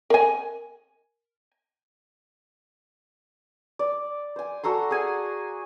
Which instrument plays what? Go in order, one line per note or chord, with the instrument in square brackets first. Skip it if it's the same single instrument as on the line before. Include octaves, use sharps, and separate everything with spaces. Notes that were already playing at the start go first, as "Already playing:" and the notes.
[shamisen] A#4 G#5
[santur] D5
C5 G#5
F#4 A4 A#5 C6
G#4 F#5 G#5